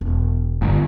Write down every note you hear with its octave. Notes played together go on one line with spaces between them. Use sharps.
E1
G1 E3